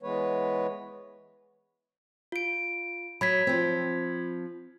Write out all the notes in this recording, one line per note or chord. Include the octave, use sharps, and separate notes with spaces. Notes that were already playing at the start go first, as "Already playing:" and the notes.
E3 G#3 B3 B4 C#5
F4 D7
F#3 B5 G#6 B6
F3 C4